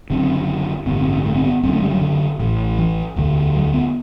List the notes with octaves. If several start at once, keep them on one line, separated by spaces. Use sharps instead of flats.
F#1 F#2 D3 C4
A1 G2 D3 B3
C4
C4
A3
C4
B3
F#1 F#2 D3 C4
A3
G3
F#3
D3
A1 A2
E3
E1 D2 D3
F#3
B3